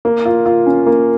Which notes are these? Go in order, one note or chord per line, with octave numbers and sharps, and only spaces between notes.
A#3
F4
F4
C#4
A#3